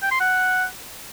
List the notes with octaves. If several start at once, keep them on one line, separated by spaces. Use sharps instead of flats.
G5
C6
F#5